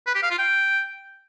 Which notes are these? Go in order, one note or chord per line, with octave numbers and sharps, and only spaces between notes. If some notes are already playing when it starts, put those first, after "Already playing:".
B4
G4
F5
F4
G5